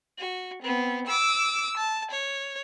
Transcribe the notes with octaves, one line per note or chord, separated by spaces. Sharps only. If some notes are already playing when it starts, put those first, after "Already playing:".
F#4
B3 C4
D6 E6
A5
C#5